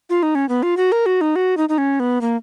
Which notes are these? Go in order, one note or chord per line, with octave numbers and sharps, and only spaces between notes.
F4
D#4
C#4
B3
F4
F#4
A#4
F#4
D#4
F#4
D#4
D#4
C#4
B3
A#3